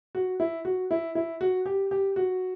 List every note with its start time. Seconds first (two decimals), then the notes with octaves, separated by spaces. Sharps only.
0.15 F#4
0.40 E4
0.65 F#4
0.91 E4
1.15 E4
1.41 F#4
1.66 G4
1.91 G4
2.16 F#4